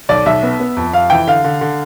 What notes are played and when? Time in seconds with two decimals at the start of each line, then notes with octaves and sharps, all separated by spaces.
0.09 B1 D5
0.26 B1 E5
0.43 B3
0.60 B3
0.77 F2
0.93 F2 F5
1.10 E3 G5
1.27 D3 F5
1.44 D3
1.61 D3